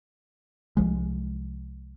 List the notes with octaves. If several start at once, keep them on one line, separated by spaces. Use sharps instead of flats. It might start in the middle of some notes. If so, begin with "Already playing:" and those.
C2 F3 G#3